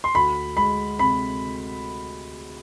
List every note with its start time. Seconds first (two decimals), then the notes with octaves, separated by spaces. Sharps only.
0.04 C6
0.15 D2 B5
0.57 G#3 B5
0.99 C3 B5